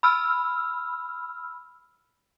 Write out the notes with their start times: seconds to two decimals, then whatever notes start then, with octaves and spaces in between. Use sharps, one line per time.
0.03 B5 E6 F6